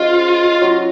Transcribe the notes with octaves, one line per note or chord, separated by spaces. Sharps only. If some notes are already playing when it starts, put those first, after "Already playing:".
Already playing: G#3 C#4 F4 F#4 C5
F#3 C#4 F#4